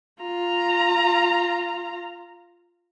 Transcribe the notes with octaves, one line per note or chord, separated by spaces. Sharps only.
F4 A#5